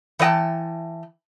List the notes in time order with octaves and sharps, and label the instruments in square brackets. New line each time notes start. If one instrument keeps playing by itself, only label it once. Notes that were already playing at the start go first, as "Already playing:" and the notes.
[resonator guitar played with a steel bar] E3 C5 D#5 G5 A5